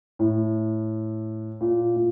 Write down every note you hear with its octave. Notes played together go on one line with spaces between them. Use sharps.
A2
A#2
A#2